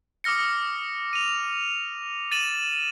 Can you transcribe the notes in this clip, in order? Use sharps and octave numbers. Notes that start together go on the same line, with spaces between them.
D6 D#6 F6 A#6 C#7
D#7 F7
A6 D#7 E7 F#7